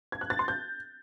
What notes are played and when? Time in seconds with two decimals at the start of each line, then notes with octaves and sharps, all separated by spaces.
0.12 G#6
0.21 F#6
0.30 A6
0.39 C6
0.48 G6